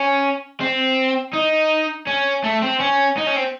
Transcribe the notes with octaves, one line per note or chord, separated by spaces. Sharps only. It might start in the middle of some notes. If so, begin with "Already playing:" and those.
Already playing: C#4
C4
D#4
C#4
A3
C4
C#4
D#4
C#4
C4